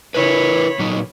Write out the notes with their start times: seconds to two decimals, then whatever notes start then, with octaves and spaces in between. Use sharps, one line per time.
0.14 C#3 E4 A#4 B4 C#5 B5
0.79 A#2 F#3 D#4